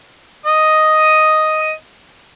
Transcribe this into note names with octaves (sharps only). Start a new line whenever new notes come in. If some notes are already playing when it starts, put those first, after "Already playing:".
D#5 D#6